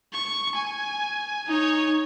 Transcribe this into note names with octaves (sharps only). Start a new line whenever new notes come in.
C#6
G#5
D#4 C#5